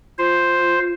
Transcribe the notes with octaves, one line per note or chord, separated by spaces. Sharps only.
F4 C5